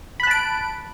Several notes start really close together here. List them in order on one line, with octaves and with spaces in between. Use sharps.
B5 F#6 A5 D7